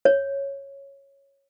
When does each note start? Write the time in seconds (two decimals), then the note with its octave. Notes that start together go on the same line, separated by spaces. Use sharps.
0.05 C#5